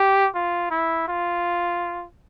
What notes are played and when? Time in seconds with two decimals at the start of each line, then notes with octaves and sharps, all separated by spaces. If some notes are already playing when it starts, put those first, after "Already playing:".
Already playing: G4
0.35 F4
0.71 E4
1.08 F4